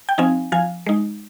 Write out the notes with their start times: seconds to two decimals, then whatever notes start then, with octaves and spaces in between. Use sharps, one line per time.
0.09 G5
0.18 F3 C4 D#4 F5 G#5
0.52 F3 F5 G#5
0.86 G#3 D#4